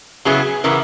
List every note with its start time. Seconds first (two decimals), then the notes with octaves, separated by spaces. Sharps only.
0.25 C#3 F#3 B3 E4 G#4
0.64 C#3 E3 B3 E4 A#4